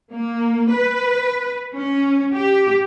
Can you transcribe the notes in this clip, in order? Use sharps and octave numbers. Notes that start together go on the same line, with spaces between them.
A#3
B4
C#4
G4